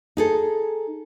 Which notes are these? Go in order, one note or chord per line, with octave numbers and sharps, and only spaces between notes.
D#4 G#4 A4